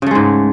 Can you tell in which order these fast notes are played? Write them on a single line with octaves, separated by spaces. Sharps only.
C#3 A3 G#3 G#2